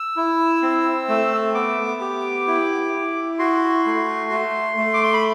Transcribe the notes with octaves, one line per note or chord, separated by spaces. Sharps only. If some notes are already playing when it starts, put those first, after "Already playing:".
Already playing: E6
E4
C4
A3
B3 D6
G4
E4
E4
F#4 C6
A3
A3
A3
D6
C6
B5